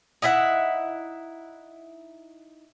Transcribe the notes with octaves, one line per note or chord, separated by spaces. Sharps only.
D#4 E4 E5 F#5